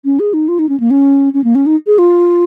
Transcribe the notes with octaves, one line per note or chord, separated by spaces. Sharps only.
C#4
G#4
D#4
F4
D#4
C#4
A#3
C#4
C#4
A#3
C#4
D#4
G#4
F4